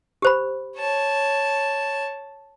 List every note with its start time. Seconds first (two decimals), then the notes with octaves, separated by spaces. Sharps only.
0.22 G4 C5 B5
0.77 C#5 A5